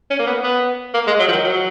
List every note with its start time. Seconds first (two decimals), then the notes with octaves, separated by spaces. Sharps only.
0.11 C#4
0.19 A#3
0.27 B3
0.44 B3
0.94 A#3
1.07 G#3
1.20 F#3
1.28 F3
1.32 D#3
1.44 F#3